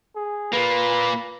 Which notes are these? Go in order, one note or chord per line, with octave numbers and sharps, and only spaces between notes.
G#4
A#2 A#3 B4